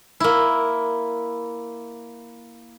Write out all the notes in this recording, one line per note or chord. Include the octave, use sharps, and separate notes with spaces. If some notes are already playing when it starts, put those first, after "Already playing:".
A#3 E4